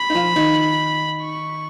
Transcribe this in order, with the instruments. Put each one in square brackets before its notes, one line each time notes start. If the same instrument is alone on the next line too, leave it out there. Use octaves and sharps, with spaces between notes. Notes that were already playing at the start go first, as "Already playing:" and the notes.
Already playing: [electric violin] B5
[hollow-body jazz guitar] D#4
F3 F4
D#3 D#4
[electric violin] C#6